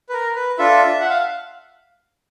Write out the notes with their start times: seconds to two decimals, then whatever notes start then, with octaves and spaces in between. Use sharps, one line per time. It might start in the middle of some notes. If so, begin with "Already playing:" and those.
0.09 B4
0.13 A#4
0.36 B4
0.58 D4 F4 A4 E5
1.01 F#5
1.10 F5